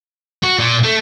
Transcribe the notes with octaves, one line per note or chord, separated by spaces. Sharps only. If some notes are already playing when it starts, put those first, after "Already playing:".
F#4
A#2
A3